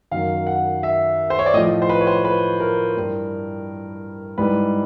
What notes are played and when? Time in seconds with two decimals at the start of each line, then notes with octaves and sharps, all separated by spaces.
0.11 F#2 D#3 F#3 F5
0.47 F#5
0.83 E5
1.30 C5
1.39 C#5
1.46 D5
1.53 A2 D#5
1.57 F3
1.82 C5
1.89 B4
2.00 C#5
2.07 C5
2.25 B4
2.60 A#4
2.96 G2 E3 G3
4.38 G#2 E3 G3 B4